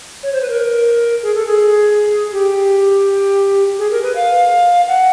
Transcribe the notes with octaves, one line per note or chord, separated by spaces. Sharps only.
C#5
C5
B4
A#4
G#4
A4
G#4
G4
G#4
A#4
B4
F5
F#5